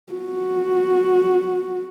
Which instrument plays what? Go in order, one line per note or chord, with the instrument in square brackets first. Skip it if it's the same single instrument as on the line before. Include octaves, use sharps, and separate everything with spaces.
[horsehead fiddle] F#4